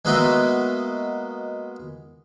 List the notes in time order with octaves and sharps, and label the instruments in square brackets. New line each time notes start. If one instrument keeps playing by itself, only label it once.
[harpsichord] G#3 A#3 B3 F#4 D#5 E5